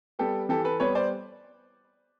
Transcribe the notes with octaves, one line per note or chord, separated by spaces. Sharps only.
G3 B3 G4 A4
E3 G4 A4
A4 B4
G3 B3 B4 C#5
C5 D5